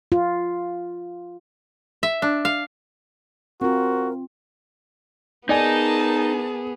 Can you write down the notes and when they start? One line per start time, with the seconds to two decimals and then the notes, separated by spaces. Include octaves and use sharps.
0.12 F4
2.03 E5
2.22 D4
2.45 F5
3.61 C4 F4 F#4 A#4
5.49 B3 D#4 G#4 A#4 D5 G#5 A5